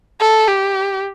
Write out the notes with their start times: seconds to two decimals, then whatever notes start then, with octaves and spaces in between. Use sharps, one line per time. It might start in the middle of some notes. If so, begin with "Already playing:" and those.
0.21 A4
0.48 G4